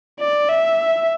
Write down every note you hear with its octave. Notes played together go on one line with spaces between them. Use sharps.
D5
E5